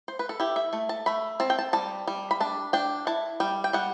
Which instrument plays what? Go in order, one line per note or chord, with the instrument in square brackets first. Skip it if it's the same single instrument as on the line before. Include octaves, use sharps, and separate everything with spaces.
[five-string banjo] C5
B4
A4
E4 G4
E5
A3
A5
A3 B5
C4 A5
G5
A5
G3 A5
G3
B5
D4 A5
D4 G5
E4 A5
G3 G5
G5
G3 F#5